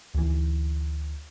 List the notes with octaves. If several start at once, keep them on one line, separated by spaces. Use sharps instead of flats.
D2 E3